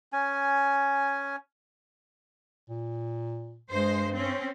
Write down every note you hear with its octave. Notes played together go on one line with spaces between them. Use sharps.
C#4 G#5
A#2
G2 G#3 C5
C4 C#4